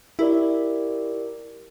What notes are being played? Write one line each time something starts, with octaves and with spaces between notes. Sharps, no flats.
E4 G4 A#4 D5